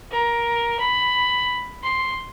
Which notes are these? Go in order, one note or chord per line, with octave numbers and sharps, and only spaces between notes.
A#4
B5
C6